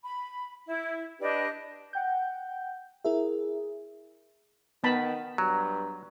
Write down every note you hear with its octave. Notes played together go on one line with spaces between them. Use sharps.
B5
E4
D4 G4 B4 D#5
F#5 G5 G6
E4 G#4 A#4 E5
D#3 B3 A5 B5
G2 F#3 A#5